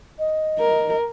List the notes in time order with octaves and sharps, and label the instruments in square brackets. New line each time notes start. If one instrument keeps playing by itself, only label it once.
[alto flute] D#5
[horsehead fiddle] A#4